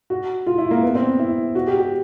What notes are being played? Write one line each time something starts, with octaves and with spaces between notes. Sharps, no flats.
F#4
F4
E4
A#3
B3
C4
E4
F#4
G4
G4